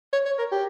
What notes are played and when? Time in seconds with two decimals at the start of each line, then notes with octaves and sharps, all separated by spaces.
0.13 C#5
0.26 C#5
0.38 A#4
0.52 G4